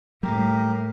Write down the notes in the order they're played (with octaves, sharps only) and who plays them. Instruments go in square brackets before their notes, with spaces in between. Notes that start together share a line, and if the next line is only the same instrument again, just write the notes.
[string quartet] A2 [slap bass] G3 A3 A#3 [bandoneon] G4 A#4